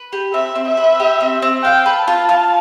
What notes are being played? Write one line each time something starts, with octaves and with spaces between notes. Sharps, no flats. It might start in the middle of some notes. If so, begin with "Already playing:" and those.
Already playing: B4
G4
C4 E5
C4
E5
B4
G4
C4
C4
F5 G5
B4
A5
F4
F4